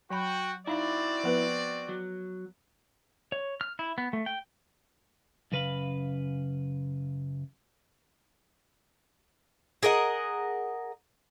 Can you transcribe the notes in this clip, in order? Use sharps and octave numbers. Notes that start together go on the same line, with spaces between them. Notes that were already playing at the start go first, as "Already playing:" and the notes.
F#3 F#4 G5 B5
C4 D#4 E4 F#4 D5 F5 B5
F3 B3 B4
F#3
C#5
F6
E4
B3
A3
G5
F#2 C#3 B4 F5 B5
G#4 A#4 D#5 F#5